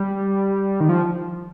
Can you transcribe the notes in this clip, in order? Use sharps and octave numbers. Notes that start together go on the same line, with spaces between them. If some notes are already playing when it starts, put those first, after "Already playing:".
Already playing: G3
D#3
F3